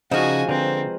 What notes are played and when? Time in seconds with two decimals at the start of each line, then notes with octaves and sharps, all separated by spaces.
0.11 C#3 F3 G#3 D#4 F#4 G#5 F6
0.49 D3 C4 B4 C5 A#5